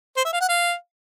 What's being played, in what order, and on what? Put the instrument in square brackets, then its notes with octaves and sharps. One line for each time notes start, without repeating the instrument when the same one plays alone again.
[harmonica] C5
E5
F5
F#5
F5